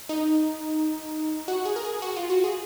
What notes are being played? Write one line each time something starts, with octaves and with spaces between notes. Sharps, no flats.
D#4
F#4
G#4
A#4
G#4
F#4
F4
F#4
G#4